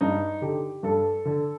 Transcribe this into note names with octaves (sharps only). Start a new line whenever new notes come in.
G2 D#4
D3 G4
G2 A4
D3